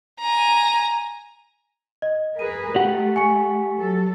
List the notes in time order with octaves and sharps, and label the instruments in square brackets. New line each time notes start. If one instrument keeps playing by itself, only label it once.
[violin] G#5 A#5
[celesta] D#5
[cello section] G#4 A#4 B4 [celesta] D#7
[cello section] A3 [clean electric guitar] G4 F#5
[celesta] G#5 C#6 C#7
[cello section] F#3 A4